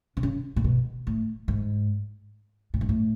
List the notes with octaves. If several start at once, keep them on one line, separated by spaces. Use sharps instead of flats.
C3
C#3
A#2
B2
A2
G#2
A2
G#2
A2